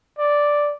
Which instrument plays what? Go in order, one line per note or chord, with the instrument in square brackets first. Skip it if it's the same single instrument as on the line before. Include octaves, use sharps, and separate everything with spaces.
[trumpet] D5